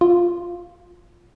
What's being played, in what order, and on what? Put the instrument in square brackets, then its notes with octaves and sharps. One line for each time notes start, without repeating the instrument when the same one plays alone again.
[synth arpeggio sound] F4